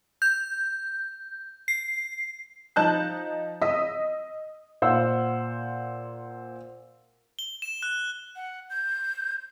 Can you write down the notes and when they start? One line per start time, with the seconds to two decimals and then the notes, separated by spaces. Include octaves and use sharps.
0.22 G6
1.68 C7
2.76 F3 D#4 A5 F#6 G6
3.62 D#5 D#6 E6 B6
4.82 A#2 C5 F5 F#5 E6
7.39 G7
7.62 E7
7.83 F#6
8.36 F#5
8.70 G6